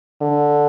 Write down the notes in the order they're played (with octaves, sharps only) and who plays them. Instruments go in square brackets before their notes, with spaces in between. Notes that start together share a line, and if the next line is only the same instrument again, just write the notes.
[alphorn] D3